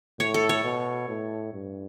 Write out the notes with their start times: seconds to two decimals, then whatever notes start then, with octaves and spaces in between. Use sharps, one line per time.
0.19 A2 C#5
0.34 A4
0.49 C#5
0.64 B2
1.09 A2
1.53 G2